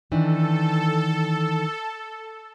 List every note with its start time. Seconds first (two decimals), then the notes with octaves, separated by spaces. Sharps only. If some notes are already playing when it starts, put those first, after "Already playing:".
0.12 D#3 E3 D4 A4